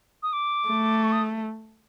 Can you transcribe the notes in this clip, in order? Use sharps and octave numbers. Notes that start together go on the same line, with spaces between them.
D#6
D6
A3
C#6
D#6